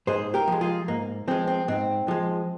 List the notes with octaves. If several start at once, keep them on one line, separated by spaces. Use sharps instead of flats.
G#2 G#4 C5
G4 A#4
F3 G#3
F4 G#4
G#2 A#3
F3 G#3 C4
C4
G#2 C4
F3 G#3